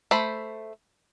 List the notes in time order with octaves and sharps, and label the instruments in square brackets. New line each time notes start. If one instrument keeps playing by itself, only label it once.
[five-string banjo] A3 C5 B5